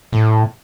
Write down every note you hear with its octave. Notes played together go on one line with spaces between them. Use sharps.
A2